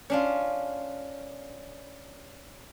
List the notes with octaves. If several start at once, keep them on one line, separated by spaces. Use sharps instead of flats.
C#4 D4 F4